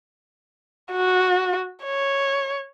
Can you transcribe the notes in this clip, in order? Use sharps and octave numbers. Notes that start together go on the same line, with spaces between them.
F#4
C#5